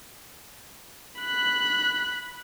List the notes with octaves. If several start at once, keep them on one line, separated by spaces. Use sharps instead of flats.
B5 F#6